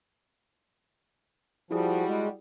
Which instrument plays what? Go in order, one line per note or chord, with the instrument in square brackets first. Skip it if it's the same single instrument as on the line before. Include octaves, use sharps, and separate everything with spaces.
[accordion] F3 [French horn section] G3 F#4 [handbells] E4 G#4
[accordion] G#3